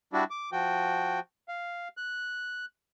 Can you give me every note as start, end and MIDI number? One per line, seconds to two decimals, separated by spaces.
0.13 0.24 55
0.13 0.24 62
0.13 0.24 64
0.13 0.24 66
0.30 0.50 86
0.52 1.20 53
0.52 1.20 66
0.52 1.20 79
1.48 1.88 77
1.97 2.65 90